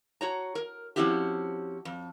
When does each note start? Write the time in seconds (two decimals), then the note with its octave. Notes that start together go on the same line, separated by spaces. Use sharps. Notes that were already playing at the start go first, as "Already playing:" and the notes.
0.21 F#4 C#5 A#5
0.55 A#4
0.96 F3 C4 C#4 E4 F#4 G4
1.85 F2